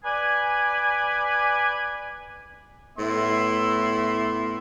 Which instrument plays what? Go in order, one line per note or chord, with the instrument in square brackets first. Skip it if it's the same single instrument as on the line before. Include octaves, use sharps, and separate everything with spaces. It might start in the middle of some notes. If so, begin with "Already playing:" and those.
[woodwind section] B4 D5 G#5
[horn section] A2 B3 E4 E5 C6